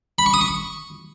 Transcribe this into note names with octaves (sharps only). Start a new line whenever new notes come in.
B5
C#6
D#6
C#6